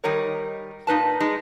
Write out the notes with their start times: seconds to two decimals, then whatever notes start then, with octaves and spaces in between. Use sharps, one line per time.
0.04 D#3 G3 D#4 A#4 C#5
0.87 A#2 D#4 B4 A5
1.20 G#3 D#4